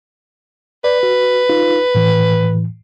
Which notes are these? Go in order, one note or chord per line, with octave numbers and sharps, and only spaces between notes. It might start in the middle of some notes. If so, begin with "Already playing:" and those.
B4 D5
F#4
D#4 F4
A2 E3